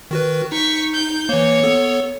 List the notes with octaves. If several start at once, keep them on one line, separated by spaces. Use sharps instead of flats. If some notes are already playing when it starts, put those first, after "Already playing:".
D#3 F#4 B4
D#4 C#6 B6
G6
E3 A#3 C#5
B3 A4